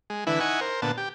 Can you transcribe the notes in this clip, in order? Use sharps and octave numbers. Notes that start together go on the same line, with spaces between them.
G#3
D3 E3 E4 B4
D#4 E4 F#5 G#5 C#6
A#4 C5
A#2 D3 B3 A5
G4